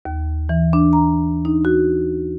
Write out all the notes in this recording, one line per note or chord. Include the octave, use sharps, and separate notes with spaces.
D#2
E3
D4
A#5
D#4
F#4